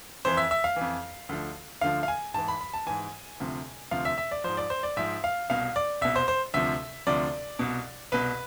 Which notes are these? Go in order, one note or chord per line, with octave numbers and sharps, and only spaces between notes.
F2 E3 C5
E5
E5
F5
F2 E3
D2 D3 F3
D2 D3 F3 F5
F5
G#5
G#2 E3 A5
B5
B5
A5
G#2 E3 G#5
D2 C3 F3
D2 C3 F3 F5
E5
E5
D5
G#2 F3 C5
D5
C5
D5
G#2 F3 E5
F5
C2 B2 F5
D5
C2 B2 E5
C5
C5
D2 C3 F3 E5
D2 C3 F3 D5
C2 B2
C2 B2 B4